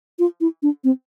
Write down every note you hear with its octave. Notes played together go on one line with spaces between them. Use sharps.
F4
E4
D4
C4